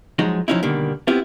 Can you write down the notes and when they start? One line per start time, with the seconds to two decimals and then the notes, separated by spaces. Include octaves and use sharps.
0.19 F3 F#3 G#3 D#4 F#4
0.48 F3 F#3 C#4 D#4 E4
0.63 B2 D3 D#3 G3 A#3
1.07 B3 C4 E4 F4 G4